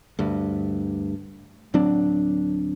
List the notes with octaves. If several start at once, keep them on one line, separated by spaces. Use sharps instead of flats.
D2 G2
D1 F#3 C4 D4